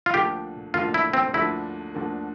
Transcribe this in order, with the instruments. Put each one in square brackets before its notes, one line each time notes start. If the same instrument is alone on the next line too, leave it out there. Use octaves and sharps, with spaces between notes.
[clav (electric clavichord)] F4
[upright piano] D2 D3 F3 A#3 [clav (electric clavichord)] G4
[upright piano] D2 D3 F3 A#3 [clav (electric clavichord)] F4
[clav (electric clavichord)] E4
C4
[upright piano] D2 D3 F3 A#3 [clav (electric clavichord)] E4
[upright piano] D2 D3 F3 A#3